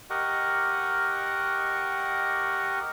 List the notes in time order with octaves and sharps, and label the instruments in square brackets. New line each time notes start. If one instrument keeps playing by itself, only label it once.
[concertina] G4 A#4 D#5 F#5 C#6